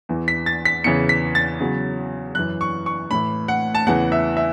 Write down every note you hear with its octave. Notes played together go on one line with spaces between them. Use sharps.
E2 E3
B6
A6
B6
E2 C#3 E3 C#7
B6
A6
E2 C#3 F#3
F#2 E3 F#6
C#6
C#6
A2 E3 B5
F#5
A5
E2 C#3 E3 F#5
E5
E5